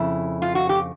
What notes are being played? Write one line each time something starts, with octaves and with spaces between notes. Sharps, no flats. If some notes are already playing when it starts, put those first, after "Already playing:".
Already playing: F2 C#3 E4
F4
F#4
G4